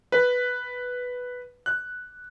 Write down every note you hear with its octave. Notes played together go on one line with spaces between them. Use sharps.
B4
F#6